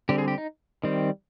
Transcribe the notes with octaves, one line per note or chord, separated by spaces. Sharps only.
D3 G3 C4 G4
G#4
G4
D#4
D#3 G3 C4